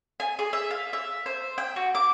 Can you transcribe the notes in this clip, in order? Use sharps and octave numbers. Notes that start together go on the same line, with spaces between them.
G#5
G#4
E5
F5
E5
C5
G5
F#4
D6